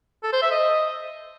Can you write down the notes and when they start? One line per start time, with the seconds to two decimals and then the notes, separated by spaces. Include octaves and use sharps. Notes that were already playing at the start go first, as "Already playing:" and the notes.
0.23 A4
0.33 C5
0.42 E5
0.51 D#5